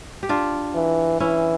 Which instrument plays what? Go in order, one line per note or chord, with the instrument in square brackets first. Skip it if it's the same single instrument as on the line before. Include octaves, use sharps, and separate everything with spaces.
[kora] G4
D4 F4
[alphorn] E3
[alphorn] E3 [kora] C#4 E4